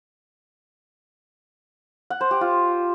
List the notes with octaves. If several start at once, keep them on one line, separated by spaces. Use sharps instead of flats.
F#5
C5
G4
F4